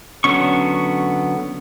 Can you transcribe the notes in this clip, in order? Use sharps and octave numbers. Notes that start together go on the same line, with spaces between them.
D3 F#3 B3 C#4 C#6